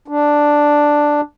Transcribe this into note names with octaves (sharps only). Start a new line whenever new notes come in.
D4